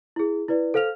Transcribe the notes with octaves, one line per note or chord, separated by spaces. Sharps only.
E4 G#4
E4 B4 D5
A4 C5 F5 F6 F7